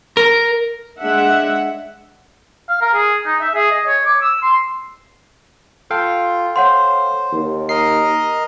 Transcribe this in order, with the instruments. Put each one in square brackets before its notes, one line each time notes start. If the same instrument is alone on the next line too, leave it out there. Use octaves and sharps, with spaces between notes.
[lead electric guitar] A#4
[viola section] G#3 D4 E5 F#5
[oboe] F5
A#4
G#4
D#4
E5
G#4
D#5
C#5
D6
E6
C6
[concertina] F4 [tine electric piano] A4 F5 G5
[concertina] C5 [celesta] C#5 F#5 C6
[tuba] D#2
[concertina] A#4 D#5 [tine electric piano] C7